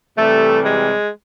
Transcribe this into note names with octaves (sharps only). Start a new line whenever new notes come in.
C3 E3 G3 A3
G#3